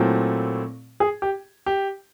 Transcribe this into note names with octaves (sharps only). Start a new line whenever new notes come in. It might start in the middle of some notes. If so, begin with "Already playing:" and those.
Already playing: A#2 F#3 A3 C4 E4
G#4
G4
G4